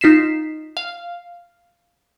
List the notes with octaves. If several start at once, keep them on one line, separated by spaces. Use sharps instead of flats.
D#4 F4 B6 C7 E7
F5